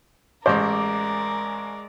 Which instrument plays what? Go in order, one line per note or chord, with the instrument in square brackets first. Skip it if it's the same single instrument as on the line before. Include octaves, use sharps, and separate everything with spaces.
[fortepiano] A1 C5 [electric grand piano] G#3 D6 [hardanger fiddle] A#4 D5